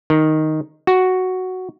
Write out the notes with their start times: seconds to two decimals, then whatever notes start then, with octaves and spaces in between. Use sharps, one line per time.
0.10 D#3
0.87 F#4